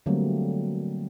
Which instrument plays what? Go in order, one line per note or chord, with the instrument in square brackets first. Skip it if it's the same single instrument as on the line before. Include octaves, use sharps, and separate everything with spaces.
[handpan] D3 F#3 G3 A3 A#3 C4